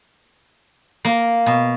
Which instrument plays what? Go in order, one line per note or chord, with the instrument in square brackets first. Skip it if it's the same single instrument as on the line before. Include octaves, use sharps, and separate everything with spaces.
[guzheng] A#3
B2